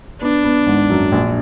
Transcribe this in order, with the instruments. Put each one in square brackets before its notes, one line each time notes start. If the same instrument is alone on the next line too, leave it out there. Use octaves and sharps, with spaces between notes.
[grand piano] B3 [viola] D4
[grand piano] B3
G#1
F#2
A#1